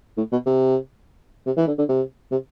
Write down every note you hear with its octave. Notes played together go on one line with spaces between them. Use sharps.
A2
B2
C3
C3
E3
D3
D3
C3
C3